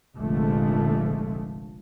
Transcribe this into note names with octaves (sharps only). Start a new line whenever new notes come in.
F1 A#1 D3 F3 G#3 A3